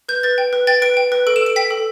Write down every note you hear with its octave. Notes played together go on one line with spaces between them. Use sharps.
B4 G6
B4 A6
G5
B4
G5 A6
B4 D7
G5
B4
A4 D7
E7
A4
D7
G5 B6
A4